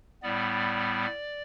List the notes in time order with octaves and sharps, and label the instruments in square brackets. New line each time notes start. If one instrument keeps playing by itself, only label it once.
[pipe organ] A2 G3 B3 D5